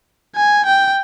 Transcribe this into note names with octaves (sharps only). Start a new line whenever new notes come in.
G#5
G5